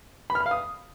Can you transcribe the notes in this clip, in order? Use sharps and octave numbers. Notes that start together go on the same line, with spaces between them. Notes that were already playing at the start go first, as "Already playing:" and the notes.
B5
F6
B5
F5
D#6